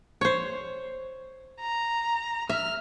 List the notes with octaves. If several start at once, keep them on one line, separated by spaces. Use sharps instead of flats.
C5 C#5
A#5
E5 F6